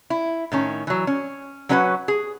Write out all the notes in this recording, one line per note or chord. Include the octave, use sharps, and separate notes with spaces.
E4
A2 D#3 C#4
E3 F#3
C#4
F#3 C#4 D4 F#4 B4 F#5
G#4